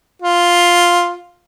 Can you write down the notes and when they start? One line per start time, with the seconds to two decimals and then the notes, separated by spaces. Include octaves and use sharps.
0.22 F4